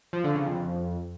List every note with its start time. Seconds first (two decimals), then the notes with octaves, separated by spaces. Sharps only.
0.13 F3
0.24 D3
0.35 C#3
0.46 F2